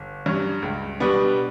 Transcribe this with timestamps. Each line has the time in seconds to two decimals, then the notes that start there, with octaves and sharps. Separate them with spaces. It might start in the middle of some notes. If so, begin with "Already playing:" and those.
Already playing: G1
0.26 G2 F#3 C#4
0.62 C#2
1.00 B2 G3 B3 D4